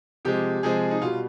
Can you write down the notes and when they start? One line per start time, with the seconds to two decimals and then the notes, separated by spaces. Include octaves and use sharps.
0.25 C3 F3 G#3 G4
0.63 C3 F3 G#3 G#4
0.91 D#4
1.02 B2 G3 F4